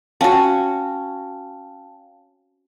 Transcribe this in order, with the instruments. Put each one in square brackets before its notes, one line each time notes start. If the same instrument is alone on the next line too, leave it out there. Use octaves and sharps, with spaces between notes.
[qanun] C#4 F#4 [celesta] F5 G5 A5